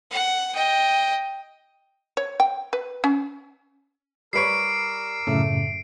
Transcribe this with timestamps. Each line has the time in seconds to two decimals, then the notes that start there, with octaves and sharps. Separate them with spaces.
0.11 F#5
0.55 D#5 G5
2.17 C#5
2.40 G5
2.73 B4
3.04 C#4
4.33 G3 A#4 B4 C#5 D6 E6 C7 D7
5.27 F#2 A2 C#3 A3